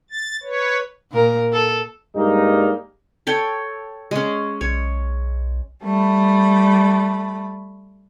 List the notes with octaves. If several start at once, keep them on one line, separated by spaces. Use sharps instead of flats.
A6
B4 C#5
A#2 A#4
A4
G2 G3 G#3 A#3 D#4
A4 C#5 G5
G#3 C#4
B1 C#5
G3 A3 B5